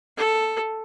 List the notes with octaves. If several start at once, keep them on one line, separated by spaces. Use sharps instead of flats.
A4